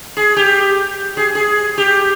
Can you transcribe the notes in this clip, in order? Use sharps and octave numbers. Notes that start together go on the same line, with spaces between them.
G#4
G4
G#4
G#4
G4